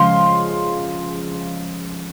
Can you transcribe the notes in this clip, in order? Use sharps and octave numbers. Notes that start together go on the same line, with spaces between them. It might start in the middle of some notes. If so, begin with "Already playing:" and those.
Already playing: C#3 F3 G#3 F5 C6